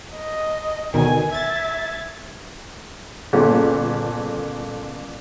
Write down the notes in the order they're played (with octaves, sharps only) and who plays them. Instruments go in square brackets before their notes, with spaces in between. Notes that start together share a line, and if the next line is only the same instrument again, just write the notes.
[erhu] D#5
[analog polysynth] D2 B2 D#3 [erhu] G#5
[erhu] E5 [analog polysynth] G#6 A6
[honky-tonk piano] G1 A#2 C#3 C#4 A4